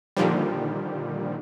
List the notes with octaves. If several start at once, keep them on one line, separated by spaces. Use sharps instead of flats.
A#2 D3 D#3 F3 G3